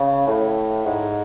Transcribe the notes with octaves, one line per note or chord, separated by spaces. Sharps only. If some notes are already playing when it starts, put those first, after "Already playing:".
Already playing: C#3
A2
G#2